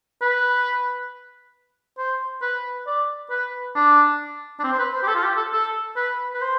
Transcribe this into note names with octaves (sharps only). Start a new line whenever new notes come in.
B4
C5
B4
D5
B4
D4
D4
C4
C5
B4
C5
G4
A4
F4
G4
A4
A4
B4
B4
C5